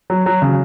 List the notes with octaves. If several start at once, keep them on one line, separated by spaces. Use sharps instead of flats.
F#3
F#3
C#3